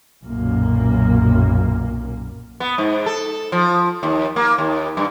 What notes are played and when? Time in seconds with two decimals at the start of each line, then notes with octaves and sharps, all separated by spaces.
0.23 B1 F#2 A#2 A#3
2.60 B3
2.78 G#2
3.06 A4
3.52 F3
4.03 D#2
4.36 A#3
4.58 D#2
4.97 G2